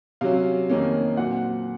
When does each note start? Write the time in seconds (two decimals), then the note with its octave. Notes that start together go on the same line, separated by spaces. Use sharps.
0.21 C3 F#3 C#4 F5
0.70 F2 D#3 A#3 C#4
1.17 A#2 F#3 C4 F#5